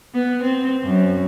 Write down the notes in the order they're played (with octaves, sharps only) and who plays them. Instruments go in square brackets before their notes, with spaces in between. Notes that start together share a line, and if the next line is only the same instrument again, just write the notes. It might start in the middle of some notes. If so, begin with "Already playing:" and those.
[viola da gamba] B3
C4
F#2